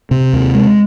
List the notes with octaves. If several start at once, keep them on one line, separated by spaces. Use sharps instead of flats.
C3
D#2
G#3